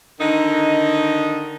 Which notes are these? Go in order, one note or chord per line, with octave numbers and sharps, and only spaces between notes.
D3 D#3 D#4